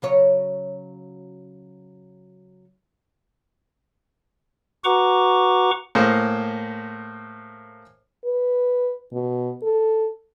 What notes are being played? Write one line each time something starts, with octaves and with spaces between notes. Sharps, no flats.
C#3 F#3 C#5
F#4 B4 F#5 A#5 C#6 D6
A2 A#3 G#4 C5
B4
B2
A4